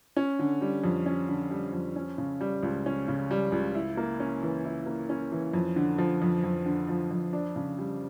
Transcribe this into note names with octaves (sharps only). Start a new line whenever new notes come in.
C#4
D3
G3
F2
C#4
D3
G3
F2
C#4
C#3
G3
C#2
C#4
C#3
G3
C#2
E4
A#3
C#4
E3
E4
A#3
C#4
E3
F2
D3
F3
F2
F2
D3
F3
F2
D4
C#3
G3